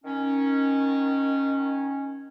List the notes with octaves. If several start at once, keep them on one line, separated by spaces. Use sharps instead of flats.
D#3 C#4